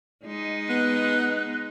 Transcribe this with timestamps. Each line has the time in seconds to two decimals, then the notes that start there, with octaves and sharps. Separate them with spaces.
0.25 G#3 D#4
0.69 B3 F#6